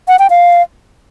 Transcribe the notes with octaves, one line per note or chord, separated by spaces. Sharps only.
F#5
G5
F5